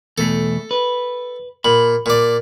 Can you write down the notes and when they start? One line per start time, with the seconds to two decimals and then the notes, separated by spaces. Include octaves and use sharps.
0.18 E2 B2 A3 A4
0.71 B4
1.65 A#2 B5
2.06 A#2 D5